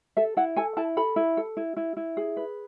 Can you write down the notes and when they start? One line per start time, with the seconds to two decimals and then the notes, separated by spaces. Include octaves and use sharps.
0.17 A4 E5
0.37 E4 F#5
0.56 A4 G#5
0.77 E4 A5
0.97 A4 B5
1.16 E4
1.37 A4
1.57 E4
1.77 E4
1.97 E4
2.17 G#4
2.37 B4